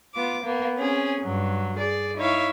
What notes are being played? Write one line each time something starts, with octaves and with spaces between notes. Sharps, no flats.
B3 F4 D6
A#3 B3
C4 C#4 G#4
G2 F#3
G#4 D5
D#4 E4 C#5 E5 F5